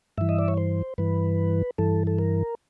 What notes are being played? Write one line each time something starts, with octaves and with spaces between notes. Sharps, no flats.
G2 E3 E5
D#5
D5
C#5
C5
G2 E3 B4
G2 E3 A4
A4
A#4